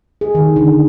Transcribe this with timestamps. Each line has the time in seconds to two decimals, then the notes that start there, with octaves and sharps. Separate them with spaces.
0.21 G#4
0.35 D#3
0.56 D3